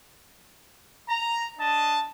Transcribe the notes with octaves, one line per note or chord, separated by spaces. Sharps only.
A#5
D4 D#5 A5